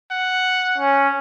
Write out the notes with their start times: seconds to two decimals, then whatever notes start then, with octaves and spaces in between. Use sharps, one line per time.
0.11 F#5
0.78 C#4